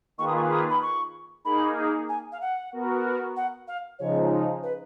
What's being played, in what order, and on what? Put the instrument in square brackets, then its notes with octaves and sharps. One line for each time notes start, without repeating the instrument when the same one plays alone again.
[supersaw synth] D#3 A#3 F4 G#4 B4 [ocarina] C#6
[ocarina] D#6
C#6
D#6
B5
C#6
[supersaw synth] A#3 D#4 G#4 [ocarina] B5
[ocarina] G#5
F5
F#5
[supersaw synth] B3 F#4 A#4
[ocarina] F#5
F5
[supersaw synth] C#3 F3 G#3 D#4 [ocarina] C#5
[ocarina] B4